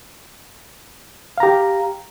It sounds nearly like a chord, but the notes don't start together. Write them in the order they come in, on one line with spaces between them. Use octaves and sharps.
F5 A#5 G4